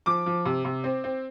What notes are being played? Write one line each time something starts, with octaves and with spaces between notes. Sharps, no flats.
F3 D6
F3
C3
C3
C4
C4